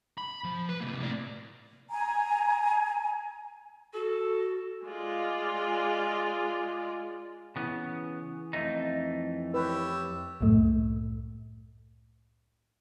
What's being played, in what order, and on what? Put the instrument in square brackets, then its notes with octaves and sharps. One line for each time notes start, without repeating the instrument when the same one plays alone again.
[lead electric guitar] B5
F3
B4
C3 A#3
A2 D5
[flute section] G#5 A#5
[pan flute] F#4 [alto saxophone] A4
[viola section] G#3 F4 D5
[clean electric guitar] C#3 B3 [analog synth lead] E3
[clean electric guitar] F2 A3 D#4
[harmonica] G4 C#5 E6 [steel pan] B4
[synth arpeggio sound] C2 F#2 A2 A3